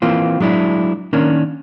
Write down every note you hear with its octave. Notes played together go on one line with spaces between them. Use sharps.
E3 A#3 C4 F4
F#3 G#3 D4 E4
D#3 A#3 C#4 D4